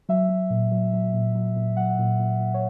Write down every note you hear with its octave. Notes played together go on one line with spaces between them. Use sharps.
F#3 E5
F#3
A#2
F#3
F#3
A#2
F#3
A#2
F#3 F#5
A#2
A#2
A#2
C#5